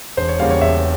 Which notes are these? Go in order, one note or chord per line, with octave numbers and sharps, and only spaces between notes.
E1 C5
C#5
E2 C#3 G3 A#3 F5
C#5
E1 E5